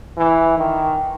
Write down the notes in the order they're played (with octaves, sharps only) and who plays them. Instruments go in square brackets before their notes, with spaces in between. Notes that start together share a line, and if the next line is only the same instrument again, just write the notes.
[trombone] E3
D#3